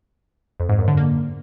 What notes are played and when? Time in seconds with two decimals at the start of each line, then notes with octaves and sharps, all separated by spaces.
0.60 F2
0.69 G#2
0.78 F#2
0.88 D3
0.97 A#3